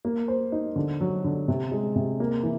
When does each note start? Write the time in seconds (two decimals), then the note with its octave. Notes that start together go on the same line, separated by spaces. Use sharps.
0.05 A#3
0.28 C5
0.52 D#4
0.76 D3
1.01 F#3
1.24 D3
1.48 C3
1.72 G#3
1.96 C3
2.20 A#3
2.43 E3